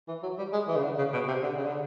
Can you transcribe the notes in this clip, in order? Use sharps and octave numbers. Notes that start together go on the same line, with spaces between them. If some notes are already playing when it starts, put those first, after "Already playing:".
E3
F#3
G3
G#3
E3
C#3
D3
C#3
B2
C3
D3
C#3
D3